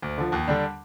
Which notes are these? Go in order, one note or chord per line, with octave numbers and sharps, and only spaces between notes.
D2
D3 F3
D#2
D3 G3 D4